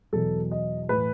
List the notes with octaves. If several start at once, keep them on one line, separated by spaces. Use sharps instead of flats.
E2 B2 F#3 A4
D#5
A2 E3 B4